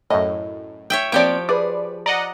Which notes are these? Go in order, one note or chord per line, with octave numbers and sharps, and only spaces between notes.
F#2 A2 D#5
C#5 E5 G5
F3 A#3 C4 G4 C#5 D5 D7
G#4 B4 D5
D5 D#5 F#5 A#5